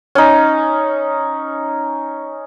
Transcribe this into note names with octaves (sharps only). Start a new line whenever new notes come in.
C#4 D#4